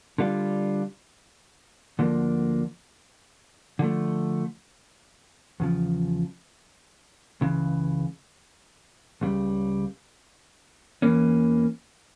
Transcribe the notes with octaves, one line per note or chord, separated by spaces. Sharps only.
D3 G3 D4 F4
D2 D3 F3 A#3 D4
D3 F3 A3
E2 C#3 F3
C#2 C#3 E3
C#2 C#3 G3
E2 E3 A#3 C#4